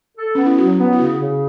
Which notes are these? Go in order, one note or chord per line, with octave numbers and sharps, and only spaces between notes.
A4
B3 C#4
E4
F#3 F#4
B3
E4
C#3 F#4
C#3